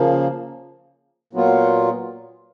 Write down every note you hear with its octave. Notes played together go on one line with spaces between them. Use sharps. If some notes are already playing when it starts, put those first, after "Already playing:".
Already playing: C#3 F3 A#3
A#2 F#3 B3 F4